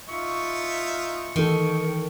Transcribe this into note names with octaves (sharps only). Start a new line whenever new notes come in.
D#4 F4 E5 C#6
D#3 E3 A4